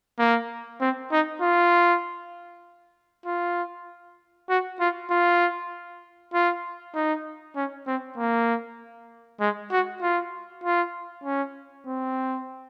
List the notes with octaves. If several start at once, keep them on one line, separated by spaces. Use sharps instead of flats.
A#3
C4
D#4
F4
F4
F#4
F4
F4
F4
D#4
C#4
C4
A#3
G#3
F#4
F4
F4
C#4
C4